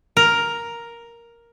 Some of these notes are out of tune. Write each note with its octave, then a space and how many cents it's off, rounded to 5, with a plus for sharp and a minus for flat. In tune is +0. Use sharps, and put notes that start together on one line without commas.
A#4 +5